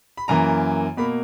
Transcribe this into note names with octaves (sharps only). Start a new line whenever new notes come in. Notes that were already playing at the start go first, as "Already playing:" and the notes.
B5
F#2 E3 A#3 A#5
B2 A#3 B5